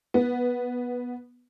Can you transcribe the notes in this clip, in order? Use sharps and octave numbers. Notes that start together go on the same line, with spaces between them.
B3